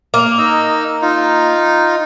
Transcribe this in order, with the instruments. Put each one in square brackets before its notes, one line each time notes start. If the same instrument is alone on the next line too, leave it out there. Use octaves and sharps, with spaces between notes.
[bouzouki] A#3
[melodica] D#4 D#5 E6
D#4 F4